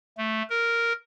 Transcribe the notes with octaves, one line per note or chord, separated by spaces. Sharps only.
A3
A#4